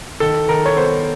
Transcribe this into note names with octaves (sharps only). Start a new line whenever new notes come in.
D#3 A4
D#3 A#4
C#5
B3 C5